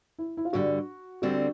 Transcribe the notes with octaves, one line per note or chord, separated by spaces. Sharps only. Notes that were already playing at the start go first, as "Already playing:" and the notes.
E4
E4
F4
G2 D3 G3 F#4
D2 D3 G3 C4 F#4